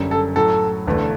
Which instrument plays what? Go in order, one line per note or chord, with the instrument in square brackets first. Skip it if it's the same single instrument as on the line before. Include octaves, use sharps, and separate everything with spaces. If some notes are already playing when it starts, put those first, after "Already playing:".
Already playing: [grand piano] F#1 F#2 D3 G3 C#4
[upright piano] A4
[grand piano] A2 F#3 A3 [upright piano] A4
[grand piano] E1 E2 D3 A3